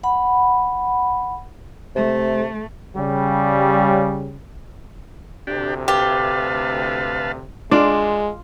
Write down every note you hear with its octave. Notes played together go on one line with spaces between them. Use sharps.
F#5 B5
C3 A3
C#3 G3
D2 C3 D4 G4
G4 B4 F5 A5
G#3 D4 F4 D5